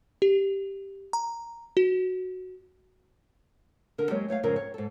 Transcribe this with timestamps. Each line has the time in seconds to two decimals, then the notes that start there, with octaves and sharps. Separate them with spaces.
0.22 G4
1.13 A#5
1.77 F#4
3.98 D3 A4 A#4
4.10 F#3 G#3 A#3 C4 G4
4.29 A3 C#5 D5 F5
4.43 F2 G#2 C#3 C4 A#4
4.56 C#5
4.74 G#2 A4